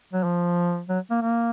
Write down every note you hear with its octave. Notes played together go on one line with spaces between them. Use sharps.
F#3
F3
F#3
A#3
A#3